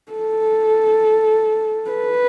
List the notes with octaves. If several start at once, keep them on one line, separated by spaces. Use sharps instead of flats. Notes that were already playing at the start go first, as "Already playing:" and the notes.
A4
B4